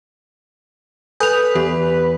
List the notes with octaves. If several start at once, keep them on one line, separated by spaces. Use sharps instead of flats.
A4 B4 G#5 D#6 G6 F7
E2 G4